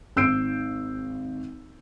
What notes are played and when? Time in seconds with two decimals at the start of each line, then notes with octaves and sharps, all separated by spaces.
0.16 G#1 E6 G6 C7 D7